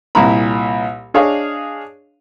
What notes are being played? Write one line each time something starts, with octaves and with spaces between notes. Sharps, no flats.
C2 A#2 E4 A#5 B5
D4 G#4 C#5 D#5 F5